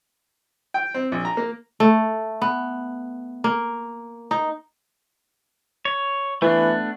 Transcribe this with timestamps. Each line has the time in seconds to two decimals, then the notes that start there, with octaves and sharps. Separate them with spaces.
0.74 G5
0.94 C4
1.12 A#1
1.25 A#5
1.37 A#3
1.80 A3
2.42 B3
3.44 A#3
4.31 D#4
5.85 C#5
6.42 E3 A3 B3 D4